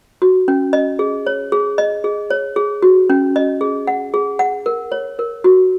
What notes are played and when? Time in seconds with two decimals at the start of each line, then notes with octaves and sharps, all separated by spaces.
0.22 F#4
0.48 C#4
0.73 D#5
0.99 G#4
1.26 C#5
1.52 G#4
1.78 D#5
2.04 G#4
2.30 C#5
2.56 G#4
2.82 F#4
3.10 C#4
3.36 D#5
3.61 G#4
3.87 F#5
4.14 G#4
4.39 F#5
4.66 A#4
4.92 C#5
5.19 A#4
5.44 F#4